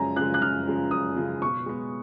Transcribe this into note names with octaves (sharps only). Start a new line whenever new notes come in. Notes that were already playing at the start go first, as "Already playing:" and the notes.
Already playing: F#2 C#3 F3 G#3 G#5 A#5
C#3 F3 G#3 F#6
F#6
F#2 F6
C#3 F3 G#3
F#2 D#6
C#3 F3 G#3
B2 C#6
G#3 B3